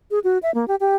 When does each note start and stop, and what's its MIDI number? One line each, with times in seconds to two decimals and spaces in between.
0.11 0.19 68
0.24 0.38 66
0.43 0.53 76
0.54 0.65 58
0.68 0.76 67
0.80 0.96 67